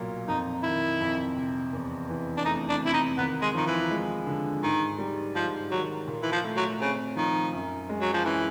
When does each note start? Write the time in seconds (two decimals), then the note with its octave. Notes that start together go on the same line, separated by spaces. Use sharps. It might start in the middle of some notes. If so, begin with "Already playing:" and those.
Already playing: B1 A#2 F#3 A#3
0.28 F2 D#4
0.63 D#3 E4
1.00 F2
1.36 C3
1.73 E2
2.09 E3
2.37 D4
2.45 A3 D#4
2.69 D4
2.82 C3 E4
2.93 D#4
3.17 D#2 B3
3.42 G#3
3.54 D#3 F3
3.67 E3
3.90 G#3
4.27 D3
4.62 G#2 D#3
4.98 G3
5.35 G#2 F3
5.71 D#3 F#3
6.07 A#2
6.23 E3
6.32 F3
6.44 A3
6.57 F#3
6.81 C#3 C4
7.16 D#3 F3
7.53 F#2
7.89 G#3
8.01 F#3
8.14 F3
8.25 E3 C#4